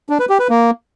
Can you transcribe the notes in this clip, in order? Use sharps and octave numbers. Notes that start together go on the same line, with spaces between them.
D4
B4
G4
B4
A#3